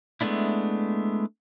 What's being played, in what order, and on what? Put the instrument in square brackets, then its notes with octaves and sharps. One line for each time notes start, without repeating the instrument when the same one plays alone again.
[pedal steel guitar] G#3 A3 B3 D4 E4